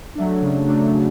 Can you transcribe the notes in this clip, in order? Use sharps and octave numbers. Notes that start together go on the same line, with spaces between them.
F#3 A3 D4
C#3
F#3 A3 D4
C#3